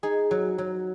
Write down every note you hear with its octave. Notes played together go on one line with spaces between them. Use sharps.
D#4 G#4
F#3
F#3